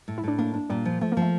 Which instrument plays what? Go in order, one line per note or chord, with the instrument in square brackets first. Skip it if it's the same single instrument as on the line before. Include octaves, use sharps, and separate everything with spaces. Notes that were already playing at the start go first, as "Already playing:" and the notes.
[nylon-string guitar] A2
[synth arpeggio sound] E4
[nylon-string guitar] A2 [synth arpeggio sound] D4
[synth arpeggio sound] A#3 [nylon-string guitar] D4
[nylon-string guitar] D4
[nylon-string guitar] A#2 [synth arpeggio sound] G3
[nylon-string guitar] F3
[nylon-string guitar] F3 [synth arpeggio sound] A3
[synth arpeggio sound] A#3
[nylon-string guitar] F3
[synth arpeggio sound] A3